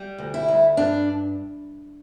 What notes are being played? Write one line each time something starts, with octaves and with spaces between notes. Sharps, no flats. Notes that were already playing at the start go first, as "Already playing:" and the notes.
Already playing: G3
D2
E4
D2
G2 D4